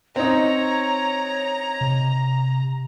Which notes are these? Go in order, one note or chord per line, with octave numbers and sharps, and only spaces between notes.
C4 D#4 C#5 A#5
C3